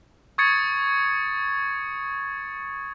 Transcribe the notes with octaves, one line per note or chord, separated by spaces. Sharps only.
C#6 D#6 G#6 A6 C#7